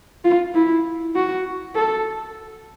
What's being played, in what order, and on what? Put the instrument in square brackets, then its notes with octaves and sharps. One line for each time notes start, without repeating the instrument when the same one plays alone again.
[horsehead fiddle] F4
E4
F#4
A4